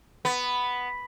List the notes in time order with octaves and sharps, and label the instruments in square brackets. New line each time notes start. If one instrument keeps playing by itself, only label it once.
[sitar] B3